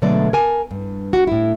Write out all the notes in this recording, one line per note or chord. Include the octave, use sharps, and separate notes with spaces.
B2 D3 F#3 G#3 A3 D5
A#4 G#5 A5
G2
F#4
A2 E4